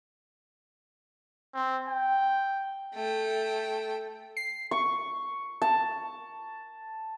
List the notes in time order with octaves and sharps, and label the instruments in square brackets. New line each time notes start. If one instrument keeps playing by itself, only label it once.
[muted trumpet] C4
G5
[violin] A3 G5
[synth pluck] C7
[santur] C#6
A5